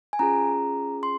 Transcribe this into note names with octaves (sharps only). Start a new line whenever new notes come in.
G#5
C#4 F4 G#4 A#5
C6